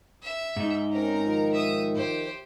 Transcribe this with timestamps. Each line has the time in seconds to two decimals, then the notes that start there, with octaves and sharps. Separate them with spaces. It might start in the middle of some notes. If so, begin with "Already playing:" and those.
0.22 E5
0.56 G#2 D#4
0.93 C4 C#4 A#4 A#5
1.24 D#3 F3
1.54 E5 D#6
1.95 G4 C5